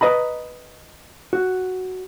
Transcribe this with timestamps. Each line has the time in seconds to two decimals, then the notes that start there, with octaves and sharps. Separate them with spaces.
0.01 B4 D#5 A#5 B5
1.33 F#4